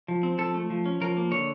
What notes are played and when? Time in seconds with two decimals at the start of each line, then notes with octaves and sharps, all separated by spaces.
0.08 F3
0.23 C4
0.38 F3 A4
0.54 A3
0.70 F3
0.86 C#4
1.01 F3 A#4
1.17 A#3
1.31 D3 C#5